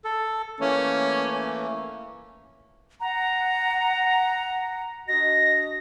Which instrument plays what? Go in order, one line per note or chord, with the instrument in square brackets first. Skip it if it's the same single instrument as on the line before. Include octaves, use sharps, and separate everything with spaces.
[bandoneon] A4
[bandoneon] E3 A3 A#3 [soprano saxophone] C#4
[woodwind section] F#5 [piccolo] A#5
[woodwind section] D4 F#4 D#5 [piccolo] A#6